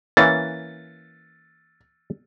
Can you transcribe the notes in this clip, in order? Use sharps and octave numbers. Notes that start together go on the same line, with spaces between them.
E3 A#3 C#4 A6